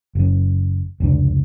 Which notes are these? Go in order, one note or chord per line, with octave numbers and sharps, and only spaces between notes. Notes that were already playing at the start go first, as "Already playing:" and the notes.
F#1 F#2
F1 C#2 D3